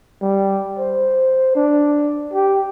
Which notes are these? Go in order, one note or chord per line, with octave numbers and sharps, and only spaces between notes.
G3
C5
D4
G4